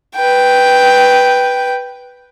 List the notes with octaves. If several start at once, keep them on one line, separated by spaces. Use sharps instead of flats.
B4 G5